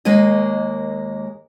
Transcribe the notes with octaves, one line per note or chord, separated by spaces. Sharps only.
D#2 G#3 A#3 G#4 D#5